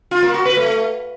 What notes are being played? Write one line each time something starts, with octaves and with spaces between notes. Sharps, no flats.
F4
A#3
F#4
B4
A3